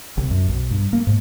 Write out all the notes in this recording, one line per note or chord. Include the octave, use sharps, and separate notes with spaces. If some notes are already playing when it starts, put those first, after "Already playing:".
C2
F#2
B1
G2
A#3
G#2